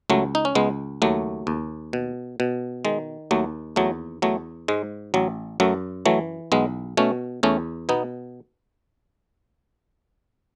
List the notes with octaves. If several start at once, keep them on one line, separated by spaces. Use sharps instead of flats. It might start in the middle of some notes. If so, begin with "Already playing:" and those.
C#2 F#3 A3
D#4
C#4
C#2 G#3 B3
D#2 F#3 A3
D#2
B2
B2
D#3 G#3
D#2 F#3 A3
E2 F#3 A3
E2 F#3 A3
G#2 G#3
A1 F#3
F#2 F#3 A3
E3 F#3 A3
B1 G#3 B3
B2 A3 C#4
E2 A3 C#4
B2 B3 D#4